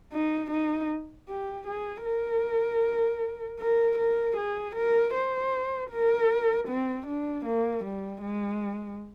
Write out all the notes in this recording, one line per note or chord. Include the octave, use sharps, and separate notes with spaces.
D#4
D#4
G4
G#4
A#4
A#4
A#4
G#4
A#4
C5
A#4
C4
D4
A#3
G3
G#3